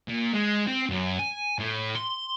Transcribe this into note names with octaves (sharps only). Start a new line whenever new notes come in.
A#2
G#3
C4
F#2
G#5
A2
C6